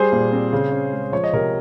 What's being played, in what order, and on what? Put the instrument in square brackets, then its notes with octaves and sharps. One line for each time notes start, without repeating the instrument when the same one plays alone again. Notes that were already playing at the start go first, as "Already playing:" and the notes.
Already playing: [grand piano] G3 G#4 C5
A#2
C4
C#3
C#4
G#3
F3 C#5
D#5
C3 A#4 C#5